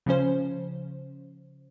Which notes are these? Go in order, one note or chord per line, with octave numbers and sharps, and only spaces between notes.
C#3 F3 C#4 C5